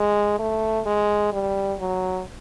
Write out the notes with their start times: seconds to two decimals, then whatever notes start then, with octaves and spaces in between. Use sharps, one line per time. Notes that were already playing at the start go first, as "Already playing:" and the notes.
Already playing: G#3
0.39 A3
0.86 G#3
1.32 G3
1.80 F#3